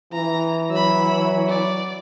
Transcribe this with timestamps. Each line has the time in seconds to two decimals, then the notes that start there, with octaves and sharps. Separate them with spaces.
0.13 E3 A#5
0.71 F#3 B5 E6
1.49 D5